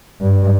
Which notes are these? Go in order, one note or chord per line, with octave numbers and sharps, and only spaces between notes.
G2